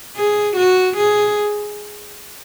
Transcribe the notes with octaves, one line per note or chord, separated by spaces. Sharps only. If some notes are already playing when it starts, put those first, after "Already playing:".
G#4
F#4
G#4